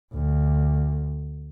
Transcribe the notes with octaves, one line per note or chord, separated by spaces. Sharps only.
D2